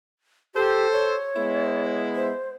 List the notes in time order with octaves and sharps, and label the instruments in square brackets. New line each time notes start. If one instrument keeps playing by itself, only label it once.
[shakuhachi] G4 [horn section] A4 C5
[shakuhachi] C#5
[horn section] G#3 B3 E4
[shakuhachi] C5